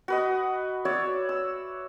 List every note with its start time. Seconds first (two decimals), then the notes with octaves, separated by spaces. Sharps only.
0.08 F#4 B4 D#5
0.85 F#4 C#5 D5 E5
1.29 E6